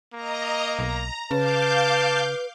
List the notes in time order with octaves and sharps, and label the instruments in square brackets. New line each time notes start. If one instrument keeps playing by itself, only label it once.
[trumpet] A#3 [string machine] D#5 A#5
[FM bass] B1 [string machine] A#5
[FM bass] C#3 [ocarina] B4 [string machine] F5 D6 G6 [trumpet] A5